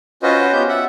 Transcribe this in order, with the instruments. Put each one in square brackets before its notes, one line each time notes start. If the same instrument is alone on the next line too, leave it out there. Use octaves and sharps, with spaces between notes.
[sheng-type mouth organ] C#4 F4 F#4 B4 C5 D#5
B3 F4 G4 G6
E5 F#5